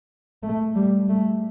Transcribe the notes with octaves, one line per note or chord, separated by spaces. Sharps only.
A3
G3
A3